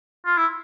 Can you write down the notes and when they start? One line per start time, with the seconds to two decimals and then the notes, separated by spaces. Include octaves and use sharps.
0.26 F4
0.37 E4